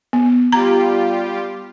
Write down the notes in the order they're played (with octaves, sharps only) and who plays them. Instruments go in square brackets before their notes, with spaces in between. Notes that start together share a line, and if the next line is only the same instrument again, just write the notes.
[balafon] B3
[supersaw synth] G3 F4 G4 [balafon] A#5